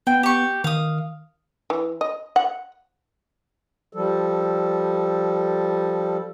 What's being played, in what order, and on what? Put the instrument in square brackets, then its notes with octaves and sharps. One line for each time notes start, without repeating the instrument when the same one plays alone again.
[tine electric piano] B3 [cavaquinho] G5
[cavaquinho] G4 C#6
[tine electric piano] D#3 [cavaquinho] F5 D#6
[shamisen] E3
D#5
F#5
[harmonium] F3 G3 A4